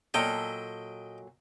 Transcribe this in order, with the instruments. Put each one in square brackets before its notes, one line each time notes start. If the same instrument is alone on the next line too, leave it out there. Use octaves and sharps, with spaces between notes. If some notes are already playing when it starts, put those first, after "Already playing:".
[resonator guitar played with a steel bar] A#2 F#3 A4 [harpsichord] D#5 G5